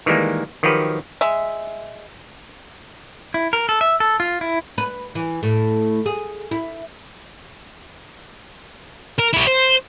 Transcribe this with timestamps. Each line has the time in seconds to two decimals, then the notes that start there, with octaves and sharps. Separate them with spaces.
0.06 D#3 E3 G3 G#3 A#3
0.63 D#3 F3 F#3 G4 B4
1.21 G#3 E5
3.34 E4
3.53 A#4
3.69 A4
3.81 E5
4.00 A4
4.20 F4
4.41 E4
4.78 B4
5.15 E3
5.43 A2
6.06 G#4
6.51 E4
9.19 A#4
9.34 E4 G4
9.47 C5